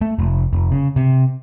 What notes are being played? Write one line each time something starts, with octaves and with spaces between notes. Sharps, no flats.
A3
F1
F1
C#3
C3